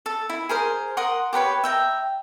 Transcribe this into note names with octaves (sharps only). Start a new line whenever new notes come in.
A4
E4
G#4 A#4 C5
A#4 F#5 C6 D#6
G4 A#4 B4 C#5
E5 G5 A#5